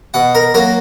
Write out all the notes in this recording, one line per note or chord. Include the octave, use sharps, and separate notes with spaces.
B2 F#5
A#4
F#3 A#3 A#4